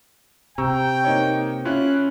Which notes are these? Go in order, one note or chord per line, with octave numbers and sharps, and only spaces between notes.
C3 G5 A#5 C#6 E6
A#3 D#4 C#5
C#4 E4 F4 F#6